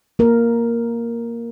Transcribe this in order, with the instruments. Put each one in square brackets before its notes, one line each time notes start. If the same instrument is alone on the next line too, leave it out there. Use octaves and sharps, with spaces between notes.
[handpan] A#3 A#4